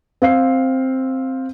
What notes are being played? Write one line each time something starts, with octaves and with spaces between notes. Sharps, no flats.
C4 F5 C7